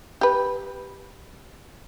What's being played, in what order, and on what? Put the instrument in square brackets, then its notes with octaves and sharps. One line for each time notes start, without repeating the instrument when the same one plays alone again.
[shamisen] G4 B4